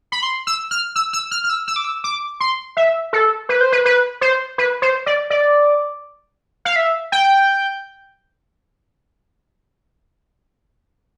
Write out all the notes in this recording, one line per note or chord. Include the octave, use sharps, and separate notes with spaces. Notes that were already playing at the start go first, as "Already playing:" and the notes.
B5
C6
E6
F6
E6
E6
F6
F6
E6
E6
D6
E6
D6
C6
E5
A4
B4
C5
B4
B4
C5
B4
C5
D5
D5
F5
E5
G5